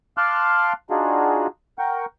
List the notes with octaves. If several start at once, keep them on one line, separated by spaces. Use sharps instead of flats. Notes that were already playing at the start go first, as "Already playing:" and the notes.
F5 A5 C6 D6 F6 F#6
D4 D#4 F4 F#4 G#4
A#4 F#5 G5 C#6